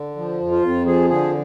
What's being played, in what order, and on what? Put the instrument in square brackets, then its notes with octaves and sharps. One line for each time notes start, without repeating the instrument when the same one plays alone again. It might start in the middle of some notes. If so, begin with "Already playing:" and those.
Already playing: [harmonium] D3
F3
F2
F4
F2
F3 G#4
D3 G#4